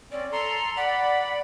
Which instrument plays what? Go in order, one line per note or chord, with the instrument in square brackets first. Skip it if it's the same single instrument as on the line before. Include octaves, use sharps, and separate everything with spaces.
[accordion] C4 C#4 [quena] D5
[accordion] A4 C6 [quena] A#5
[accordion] D5 B5 [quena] F#5